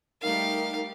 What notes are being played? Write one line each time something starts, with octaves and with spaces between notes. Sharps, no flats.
G3 A3 D#4 G4 A#4 F5